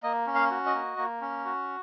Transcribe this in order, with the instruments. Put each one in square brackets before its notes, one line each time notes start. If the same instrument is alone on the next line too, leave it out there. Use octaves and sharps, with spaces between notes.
[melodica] A#3 D#5
C#4
F5
F#4
D#5
A#3
A#3
C#4
F#4